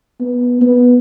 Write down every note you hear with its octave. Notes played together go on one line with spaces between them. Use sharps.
B3
B3